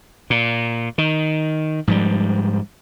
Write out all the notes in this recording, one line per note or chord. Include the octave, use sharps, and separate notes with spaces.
A#2
D#3
G#2 F3 G3